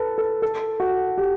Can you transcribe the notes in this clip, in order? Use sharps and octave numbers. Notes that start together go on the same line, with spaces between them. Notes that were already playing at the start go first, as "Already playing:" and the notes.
Already playing: A4 B4
A4
A4
F#4
G4